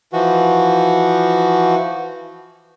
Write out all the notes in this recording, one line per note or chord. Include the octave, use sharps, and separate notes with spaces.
E3 F3 F#4